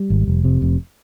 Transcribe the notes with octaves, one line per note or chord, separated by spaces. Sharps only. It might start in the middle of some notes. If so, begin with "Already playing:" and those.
Already playing: G3
G#1
F1
C3
F1